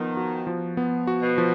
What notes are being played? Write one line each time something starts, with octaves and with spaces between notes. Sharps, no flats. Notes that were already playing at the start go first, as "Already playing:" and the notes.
Already playing: D#3 F3 B3
F#4
F3
B3
F#4
B2
F3